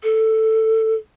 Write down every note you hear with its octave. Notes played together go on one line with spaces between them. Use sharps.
A4